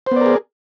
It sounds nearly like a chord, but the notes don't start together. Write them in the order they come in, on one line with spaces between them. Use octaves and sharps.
C5 B3 D5 A#4 G#4